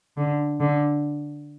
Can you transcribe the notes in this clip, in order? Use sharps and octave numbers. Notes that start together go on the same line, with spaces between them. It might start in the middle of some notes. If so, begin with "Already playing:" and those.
D3
D3